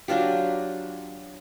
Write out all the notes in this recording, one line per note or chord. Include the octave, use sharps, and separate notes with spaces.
F#3 D4 F4 G4